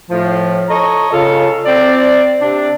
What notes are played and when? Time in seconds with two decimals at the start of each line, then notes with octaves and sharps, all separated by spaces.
0.10 A2 F3
0.69 A4 C#5 D#5 A#5
1.11 C#3 F4 A4
1.65 C4 D5
2.40 C3 D4